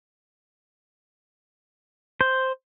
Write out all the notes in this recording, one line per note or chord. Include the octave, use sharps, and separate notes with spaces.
C5